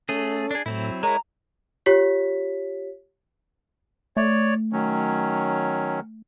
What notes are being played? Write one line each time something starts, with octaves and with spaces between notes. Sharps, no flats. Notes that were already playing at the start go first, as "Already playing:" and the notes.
A3 C#4 G#4 A4
D4 G#4
A2 F#3 C4 E4
G#3 E4 G#4 A#4 C#5 A#5
F4 G4 C#5 B6
A3 C#5 D5
D#3 F#3 C#4